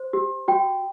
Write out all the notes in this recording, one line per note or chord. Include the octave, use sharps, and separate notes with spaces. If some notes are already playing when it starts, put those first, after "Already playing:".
Already playing: C5
G4
F#4 G5